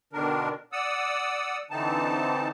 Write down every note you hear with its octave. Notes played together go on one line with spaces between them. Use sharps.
B2 D3 D#3 D4 A#4
D5 F#5 D#6 E6
D3 E3 C4 D#4 A5